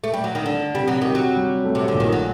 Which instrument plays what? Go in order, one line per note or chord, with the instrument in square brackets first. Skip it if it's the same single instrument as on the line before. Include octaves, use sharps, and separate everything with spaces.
[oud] A3
G3
F#3
D#3
[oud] D3 [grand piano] D4
[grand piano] C3 [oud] G3
[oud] F#3
[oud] D#3 [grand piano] G4
[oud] F#3
[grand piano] G3
A3
[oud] C3
D3
[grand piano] A#1
[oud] D#3
F#3